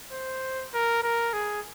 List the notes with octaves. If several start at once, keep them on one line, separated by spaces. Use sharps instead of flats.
C5
A#4
A#4
G#4